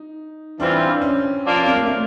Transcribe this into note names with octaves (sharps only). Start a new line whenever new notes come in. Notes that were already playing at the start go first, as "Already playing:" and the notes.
Already playing: D#4
E3 G3 C4 D4 F4
C#4
F3 A#3 D4 F4
C#4
C4
A#3
A3